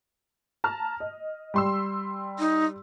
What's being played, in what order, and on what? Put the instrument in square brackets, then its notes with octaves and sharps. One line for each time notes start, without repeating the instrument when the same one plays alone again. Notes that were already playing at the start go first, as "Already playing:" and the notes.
[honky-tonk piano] A5 A#5 F6
D#5
G3 C6 E6
[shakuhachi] D#4